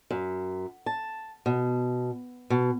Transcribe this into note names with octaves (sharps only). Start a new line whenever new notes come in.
F#2
A5
B2
B2